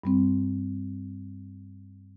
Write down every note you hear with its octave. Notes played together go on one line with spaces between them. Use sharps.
G2 G3 C4